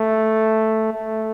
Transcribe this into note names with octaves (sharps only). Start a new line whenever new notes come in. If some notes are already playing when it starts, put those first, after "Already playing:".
Already playing: A3
A3